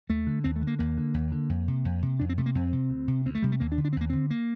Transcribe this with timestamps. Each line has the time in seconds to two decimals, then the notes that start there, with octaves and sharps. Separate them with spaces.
0.09 D#2 A3
0.27 D3
0.44 D#2 C4
0.56 A3
0.62 D3
0.67 A#3
0.79 D#2 A#3
0.97 D3
1.14 D#2
1.32 D3
1.49 F2
1.68 C3
1.85 F2
2.02 C3
2.19 F2 D4
2.29 C4
2.38 C3 A3
2.46 A#3
2.55 F2 C4
2.73 C3
2.90 D2
3.08 C3
3.26 D2 C4
3.35 A3
3.42 C3 G3
3.52 A3
3.60 D#2 A#3
3.72 D4
3.78 D3
3.85 D4
3.93 C4
3.96 D#2 A#3
4.10 D3 C4
4.30 A#3